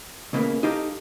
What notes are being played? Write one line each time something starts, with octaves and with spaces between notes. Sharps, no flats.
C#2 C#3 A#3 B3
D#4 G4 A4 F5 G5 A#5